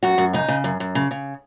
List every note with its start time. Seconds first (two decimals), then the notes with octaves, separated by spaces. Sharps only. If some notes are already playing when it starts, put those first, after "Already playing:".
0.03 F#2 F#4
0.18 F#2
0.33 C#3 D#4
0.48 C#3
0.64 F#2
0.80 F#2
0.95 C#3
1.11 C#3